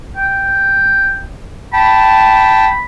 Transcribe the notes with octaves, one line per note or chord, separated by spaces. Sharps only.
G5
G5 A5 B5